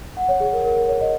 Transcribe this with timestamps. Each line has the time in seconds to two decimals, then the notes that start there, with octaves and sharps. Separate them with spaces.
0.17 F#5
0.29 C#5
0.40 G#4
0.53 A#4
0.65 A#4
0.77 A#4
0.89 C#5
1.01 D#5